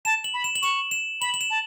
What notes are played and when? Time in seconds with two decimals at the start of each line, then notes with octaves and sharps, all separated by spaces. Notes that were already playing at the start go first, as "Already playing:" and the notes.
0.05 A5 E7
0.24 F#7
0.34 B5
0.44 E7
0.56 F#7
0.62 C#6 E7
0.91 E7
1.21 B5 F#7
1.34 F#7
1.41 E7
1.50 A5